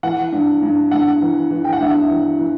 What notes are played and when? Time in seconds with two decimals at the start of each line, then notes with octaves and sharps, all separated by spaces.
0.03 E3 F#5
0.32 G2
0.62 G2
0.91 G2 F#5
1.22 E3
1.51 E3
1.64 G5
1.73 F#5
1.81 G2 E5
2.10 E3
2.39 E3